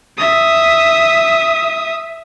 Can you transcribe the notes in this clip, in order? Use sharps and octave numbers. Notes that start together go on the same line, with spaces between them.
E5 D#6